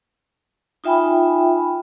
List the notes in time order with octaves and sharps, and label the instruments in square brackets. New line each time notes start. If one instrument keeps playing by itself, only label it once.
[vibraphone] D#4 F4 E5 G5 G#5 B5